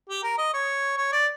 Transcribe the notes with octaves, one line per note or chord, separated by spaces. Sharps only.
G4
A#4
D#5
C#5
C#5
D5